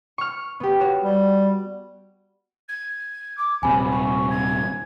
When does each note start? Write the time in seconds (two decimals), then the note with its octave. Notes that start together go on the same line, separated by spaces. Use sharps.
0.18 C#6 F6
0.60 B3 G4
0.80 F#4 C#5 E7
1.04 G3
2.68 G#6
3.37 D6
3.63 D#1 C3 G#5 B5
3.91 C#6
4.30 G#6